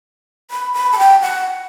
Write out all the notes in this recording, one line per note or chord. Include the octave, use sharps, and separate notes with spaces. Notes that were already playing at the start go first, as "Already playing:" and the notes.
B5
B5
A5
G5
F#5